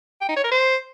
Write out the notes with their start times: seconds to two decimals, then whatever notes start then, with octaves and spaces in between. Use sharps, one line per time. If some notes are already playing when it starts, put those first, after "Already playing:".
0.21 G5
0.29 D#4
0.36 C#5
0.44 A#4
0.51 C5